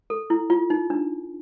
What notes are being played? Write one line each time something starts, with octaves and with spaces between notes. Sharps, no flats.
A4
E4
F4
D#4
D4